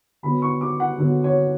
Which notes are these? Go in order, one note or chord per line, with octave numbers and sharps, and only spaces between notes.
D3 F#3 B3 B5
C#6
D6
F#5
D3 F#3 B3
C#5